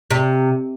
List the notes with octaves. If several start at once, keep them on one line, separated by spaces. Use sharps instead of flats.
C3